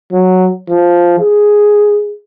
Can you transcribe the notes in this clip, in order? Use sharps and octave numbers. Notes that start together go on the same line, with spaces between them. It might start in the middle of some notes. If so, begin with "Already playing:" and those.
F#3
F3
G#4